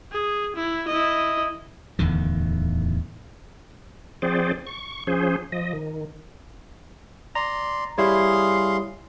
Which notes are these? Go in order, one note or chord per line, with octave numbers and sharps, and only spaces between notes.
G#4
E4
E4 D#5
D1 E2 D3 D#3
F3 C4 G#4 C5 D5
C#6
F3 C#4 G#4 C5
F3 D#5
D#3
D5 A#5 C6
G3 E4 G#4 C#5 F5 C6